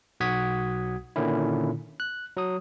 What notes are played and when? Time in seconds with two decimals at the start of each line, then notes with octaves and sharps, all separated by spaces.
0.20 B1 F#4 F#5 D#6 G#6 B6
1.16 A#2 D3 D#3 C#4 E4
2.00 F#6
2.37 F#3 D#6